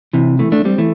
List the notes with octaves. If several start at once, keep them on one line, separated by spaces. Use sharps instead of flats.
C3 E3
E3 A3
A3 D4
G3 C4
E3 A3